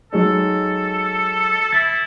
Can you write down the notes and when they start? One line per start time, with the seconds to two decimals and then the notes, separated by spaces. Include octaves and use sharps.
0.13 F#3 G#3 D#4 A4
1.73 E4 A6